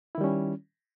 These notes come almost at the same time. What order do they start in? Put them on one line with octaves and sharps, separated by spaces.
E4 D#3 G3 C#4